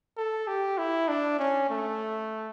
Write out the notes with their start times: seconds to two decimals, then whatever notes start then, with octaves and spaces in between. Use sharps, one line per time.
0.17 A4
0.47 G4
0.78 E4
1.08 D4
1.39 C#4
1.70 A3